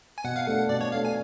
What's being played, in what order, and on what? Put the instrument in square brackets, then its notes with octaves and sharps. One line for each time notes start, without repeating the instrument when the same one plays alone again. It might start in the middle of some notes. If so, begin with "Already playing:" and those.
[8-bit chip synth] G#5
[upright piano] B2 [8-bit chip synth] F#5
[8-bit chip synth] F5
[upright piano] A3 D4 [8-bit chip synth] F#5
[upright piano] B2 [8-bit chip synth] D5
[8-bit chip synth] C#5
[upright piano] A3 D4 [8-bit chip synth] F5
[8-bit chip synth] G#5